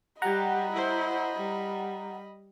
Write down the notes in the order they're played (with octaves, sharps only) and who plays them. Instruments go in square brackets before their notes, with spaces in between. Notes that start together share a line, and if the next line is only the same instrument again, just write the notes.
[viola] G3 G4 [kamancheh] D#5 B5 [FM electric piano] F#5 A#5
[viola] E4 C5
G3